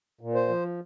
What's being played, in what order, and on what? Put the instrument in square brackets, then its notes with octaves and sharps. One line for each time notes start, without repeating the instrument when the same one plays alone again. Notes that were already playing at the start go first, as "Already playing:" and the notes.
[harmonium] A#2
C5
F3